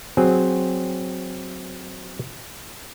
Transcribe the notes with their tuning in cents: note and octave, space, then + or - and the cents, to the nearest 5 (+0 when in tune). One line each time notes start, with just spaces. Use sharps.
F#3 +0 C4 -5 G#4 +0